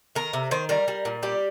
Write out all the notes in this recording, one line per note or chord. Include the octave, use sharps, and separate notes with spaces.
D#3 A#4
C3
D#3 C5
G3 A#4
G3
A#2
G3 G4